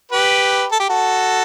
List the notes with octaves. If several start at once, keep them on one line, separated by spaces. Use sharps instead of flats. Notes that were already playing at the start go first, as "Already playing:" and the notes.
G4 B4
A4
G4
F#4 A4